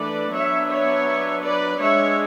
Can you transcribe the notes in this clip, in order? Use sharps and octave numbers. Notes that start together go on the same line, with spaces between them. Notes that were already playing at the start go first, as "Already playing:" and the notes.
Already playing: E3 A3 D4 B4 D5
F#3 B3 D4 C#5 E5
C#5 E5
B4 D5
G#3 D4 C#5 E5